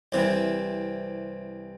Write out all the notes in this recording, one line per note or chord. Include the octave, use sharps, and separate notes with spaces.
C2 C3 E3